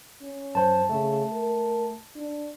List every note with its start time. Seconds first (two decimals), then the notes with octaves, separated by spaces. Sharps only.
0.22 C#4
0.55 F#2 C5 A5
0.89 C#3 A3
1.33 A#4
2.16 D4